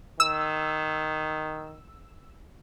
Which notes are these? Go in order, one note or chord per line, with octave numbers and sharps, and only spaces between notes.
D#3 E6